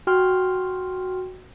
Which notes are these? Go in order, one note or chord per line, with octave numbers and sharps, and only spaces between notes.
F#4 G5 C6 F6